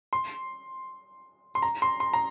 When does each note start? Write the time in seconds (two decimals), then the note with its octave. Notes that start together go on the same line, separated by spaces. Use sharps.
0.13 C6
1.55 C6
1.62 A#5
1.82 C6
2.00 C6
2.13 A#5